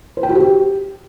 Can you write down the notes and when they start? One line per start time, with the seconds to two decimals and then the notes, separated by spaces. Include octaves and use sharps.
0.17 C5
0.23 G5
0.29 F#4
0.35 G4